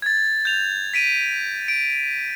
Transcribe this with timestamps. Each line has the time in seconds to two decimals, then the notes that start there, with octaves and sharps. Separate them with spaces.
0.02 G#6 A6
0.45 G6 F7
0.94 B6 D7 D#7
1.68 D7